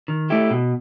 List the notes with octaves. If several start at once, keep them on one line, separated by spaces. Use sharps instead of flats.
D#3
A3 E4 G4
B2